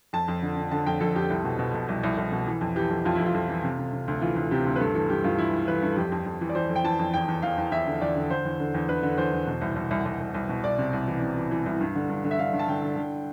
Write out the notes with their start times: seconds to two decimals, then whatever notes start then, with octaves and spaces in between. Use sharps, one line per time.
0.13 F2 A5
0.28 F2
0.42 D3
0.57 D3
0.71 D3 A5
0.86 F2 G5
1.00 F2 A4
1.16 F2 G4
1.30 C2
1.44 B2
1.59 B2
1.74 B2
1.88 C2
2.03 C2
2.18 C2
2.32 B2
2.47 E3
2.61 F2
2.76 E3 G4
2.91 F2
3.05 F2 F4
3.15 F2 E4
3.26 F4
3.34 F2
3.49 E3
3.64 C3
3.78 C3
3.93 C3
4.08 D2
4.21 E3 F4
4.36 D2
4.51 C3 G4
4.66 D2
4.76 B4
4.80 G2 A4
4.95 E3 A4
5.09 G2 G4
5.24 G2 F4
5.38 E3 E4
5.53 E3
5.68 E3 B4
5.82 G2 A4
5.97 F2 G4
6.12 F2
6.26 F2
6.41 E3
6.49 D5
6.55 E3 C5
6.69 F2
6.76 G5
6.84 E3 A5
6.99 F2
7.13 E2 G5
7.28 E2
7.42 E2 F5
7.58 E2
7.71 E2 E5
7.87 D3
8.01 E2 D5
8.16 D3
8.30 D3 C5
8.45 E2
8.59 D3
8.74 E2
8.88 D3 B4
9.03 D3
9.18 E2 C5
9.33 E2
9.47 B2
9.61 C2
9.76 C2
9.91 C2
10.05 C2
10.20 C2
10.34 C2
10.49 B2
10.64 C2 D5
10.78 C3
10.93 C2
11.08 E3
11.22 C3
11.37 E3
11.51 E3
11.66 C2
11.81 G2
11.95 D3
12.10 G2
12.24 D3
12.31 E5
12.38 D3 F5
12.53 G2
12.59 A5
12.68 D3 G5
12.82 D3
12.97 D3